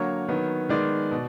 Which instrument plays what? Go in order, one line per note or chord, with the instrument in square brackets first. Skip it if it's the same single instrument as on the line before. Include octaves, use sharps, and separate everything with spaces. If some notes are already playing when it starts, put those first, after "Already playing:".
Already playing: [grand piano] D3 F#3 A#3 C#5
D#3 F#3 B3
D#3 G#3 B3 D5
B2